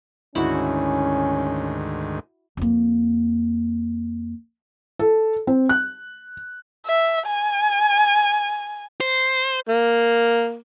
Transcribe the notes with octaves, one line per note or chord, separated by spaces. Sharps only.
D2 G#2 D#3 C#4 E4 F#4
F2 A#3
A4
C4
F#6
E5
G#5
C5
A#3